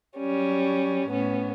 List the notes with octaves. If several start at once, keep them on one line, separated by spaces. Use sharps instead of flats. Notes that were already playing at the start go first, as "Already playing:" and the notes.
F#3 G3 C#4
A2 B3 C#4